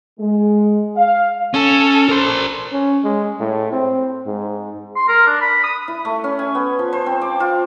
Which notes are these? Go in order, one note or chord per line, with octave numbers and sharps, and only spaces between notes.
G#3
F5
C#4 A4
A#4 C5
C#4
G#3
A2
C4
G#2
C6
A#4
D4
B5
D#6
E4
A3
C#4
G#5
B3
F3
C5
C4
D6
F4